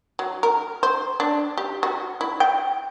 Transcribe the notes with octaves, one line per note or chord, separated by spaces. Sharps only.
F#3
A#4
C5
D4
G4
F#4
E4
G5